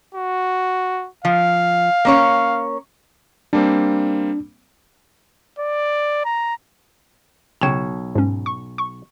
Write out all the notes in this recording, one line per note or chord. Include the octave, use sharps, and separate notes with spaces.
F#4
F3 F5
A#3 C#4 C#5
G3 A#3 C4 D4
D5
A#5
B1 C#3 C#5 G5 E7
G#2 C#4
C#6
C#6